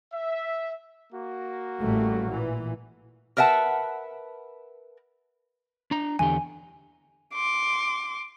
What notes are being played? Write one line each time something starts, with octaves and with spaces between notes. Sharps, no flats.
E5
A#3 F#4
A1 G3 A3
A#2 E3
A#4 B4 E5 F#5 A5
D4 A#5
E2 D3 G4 G#5
C6 D6